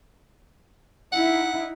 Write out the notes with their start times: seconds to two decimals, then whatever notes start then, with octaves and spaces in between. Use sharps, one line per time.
1.13 D#4 E4 F#5